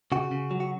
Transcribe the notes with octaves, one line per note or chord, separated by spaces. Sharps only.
C#3 F#4
C#3
F#3
F#4